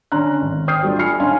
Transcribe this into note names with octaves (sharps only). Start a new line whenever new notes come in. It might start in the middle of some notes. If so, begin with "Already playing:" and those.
D3 C#4 A#5 C6 F#6
G#1
C5 G5 D#6 F6 G6 C7
F#3 G3 A3 D4 F4
G#5 B5 F6 C7 C#7
C#4 D#4 F5 G#5 C6